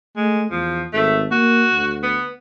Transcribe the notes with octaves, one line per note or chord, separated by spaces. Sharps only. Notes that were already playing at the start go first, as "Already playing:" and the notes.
G#3 A3
E2 F3
G#1 A3
A#3 F#4
D2
B3